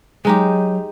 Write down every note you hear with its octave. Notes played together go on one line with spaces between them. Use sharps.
F#3 G#3 D#4 G4